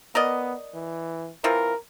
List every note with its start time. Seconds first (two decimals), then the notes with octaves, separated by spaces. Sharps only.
0.15 B3 A#4 D5 D#5
0.74 E3
1.44 E3 C4 F4 A#4